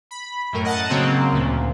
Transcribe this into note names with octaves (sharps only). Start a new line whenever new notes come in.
B5
F#2 A2 A#4
D#5 F#5 A5
C#3 F#3 A#3 C4
D2 A#2